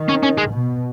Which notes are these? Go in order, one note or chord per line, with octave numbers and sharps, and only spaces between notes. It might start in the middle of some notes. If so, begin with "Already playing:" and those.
Already playing: D#3
C#4
C#4
G#3
B2